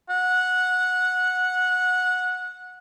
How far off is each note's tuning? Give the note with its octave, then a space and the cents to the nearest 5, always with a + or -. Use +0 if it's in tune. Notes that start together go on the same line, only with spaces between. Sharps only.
F#5 -15